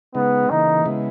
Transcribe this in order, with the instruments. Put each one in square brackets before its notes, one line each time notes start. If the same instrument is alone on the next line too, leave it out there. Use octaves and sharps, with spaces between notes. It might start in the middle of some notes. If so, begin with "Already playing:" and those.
[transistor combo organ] C#3 G#3 D#4 [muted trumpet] B3
[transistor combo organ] C#3 E3 A#3 [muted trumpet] D#4
[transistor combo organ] C#3 G#3 B3 E4